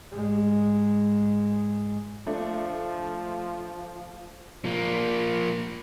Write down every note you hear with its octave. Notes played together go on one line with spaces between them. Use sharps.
G#2 G#3
F3 A3 D4
F3 A#3